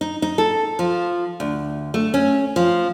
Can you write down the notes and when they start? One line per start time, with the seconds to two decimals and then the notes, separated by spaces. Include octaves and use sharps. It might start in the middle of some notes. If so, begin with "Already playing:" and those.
0.01 D#4
0.22 D#4
0.38 A4
0.79 F3
1.40 D2
1.94 A3
2.14 C#4
2.56 F3